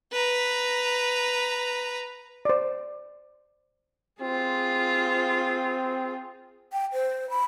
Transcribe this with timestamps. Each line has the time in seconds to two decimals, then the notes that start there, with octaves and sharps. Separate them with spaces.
0.12 B4 A#5
2.45 C5 D5
4.22 C4 F4 G#4
6.72 G5
6.93 C5
7.30 B5